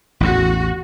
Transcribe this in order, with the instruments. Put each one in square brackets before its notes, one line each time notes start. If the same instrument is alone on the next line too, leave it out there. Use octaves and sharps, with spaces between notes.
[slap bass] A1 E2 A2 [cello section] F#4